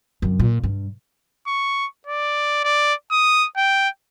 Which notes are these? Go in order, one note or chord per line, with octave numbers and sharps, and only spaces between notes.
F#2 C3
A#2
G2
C#6
D5
D5
D#6
G5